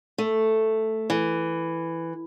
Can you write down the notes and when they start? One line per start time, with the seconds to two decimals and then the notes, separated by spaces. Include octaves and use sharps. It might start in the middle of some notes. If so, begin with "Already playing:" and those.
0.18 A3
1.10 E3